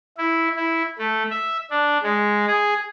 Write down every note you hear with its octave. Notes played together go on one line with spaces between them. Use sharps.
E4
E4
A3
E5
D4
G#3
G#4